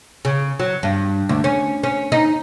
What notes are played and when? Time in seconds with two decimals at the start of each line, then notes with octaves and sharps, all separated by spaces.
0.25 C#3
0.60 F#3
0.83 G2
1.29 D2
1.44 C#4
1.83 C#4
2.12 D#4